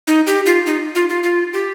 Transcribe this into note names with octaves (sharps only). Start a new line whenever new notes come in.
D#4
G4
F4
D#4
F4
F4
F4
G4